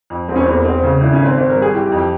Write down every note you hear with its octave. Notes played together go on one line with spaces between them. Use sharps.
F2
E1 C4
C#4
C4
E2
A#3
E1 C4
C#3
G#1 E4
C#4
G#1
C4
G#1 C4
A#4
G2
G#4
E3 G4
G4
F2
G4